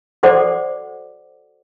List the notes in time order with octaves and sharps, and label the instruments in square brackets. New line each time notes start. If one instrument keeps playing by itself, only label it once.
[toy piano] F#4 A4 C5 D5 F#5 D6